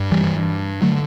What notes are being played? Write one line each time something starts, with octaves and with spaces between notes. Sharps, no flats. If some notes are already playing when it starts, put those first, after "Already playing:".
Already playing: G2
E3 G3
D3 F#3 A3